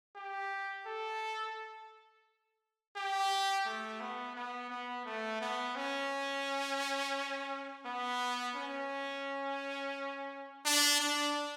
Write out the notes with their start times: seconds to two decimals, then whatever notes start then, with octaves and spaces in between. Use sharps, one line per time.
0.15 G4
0.86 A4
2.96 G4
3.66 A3
4.00 B3
4.35 B3
4.70 B3
5.05 A3
5.41 B3
5.76 C#4
7.85 B3
8.55 C#4
10.65 D4
11.00 D4